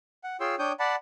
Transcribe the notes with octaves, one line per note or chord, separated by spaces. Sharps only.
F#5
F4 G#4 C#5 G5 C6 E6
D4 C#5 G5 D#6 G6
D5 F#5 A5 B5